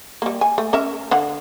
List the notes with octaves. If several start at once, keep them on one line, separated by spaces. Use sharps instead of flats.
G3 A#3
G#5
A3
C#4 A#4 E5
D3 F5 F#5